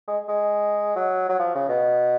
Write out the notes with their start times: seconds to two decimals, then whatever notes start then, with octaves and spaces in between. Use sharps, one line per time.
0.07 G#3
0.28 G#3
0.96 F#3
1.29 F#3
1.39 F3
1.55 C#3
1.69 B2